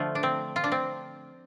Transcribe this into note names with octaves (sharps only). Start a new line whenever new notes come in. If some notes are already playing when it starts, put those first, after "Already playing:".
Already playing: D3 F3 A3 F4
D4
C4
F4
D4
C4